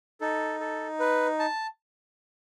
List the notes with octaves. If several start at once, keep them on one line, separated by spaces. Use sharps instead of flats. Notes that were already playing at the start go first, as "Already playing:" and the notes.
D#4 A4
A4
B4
A5